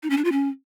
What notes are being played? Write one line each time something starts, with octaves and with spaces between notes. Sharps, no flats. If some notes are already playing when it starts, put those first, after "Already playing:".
D#4
C#4
D4
F4
C#4